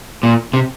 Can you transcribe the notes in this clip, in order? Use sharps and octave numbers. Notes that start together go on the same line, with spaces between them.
A#2
C3